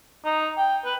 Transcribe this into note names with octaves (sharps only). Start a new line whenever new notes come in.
D#4
G5
B4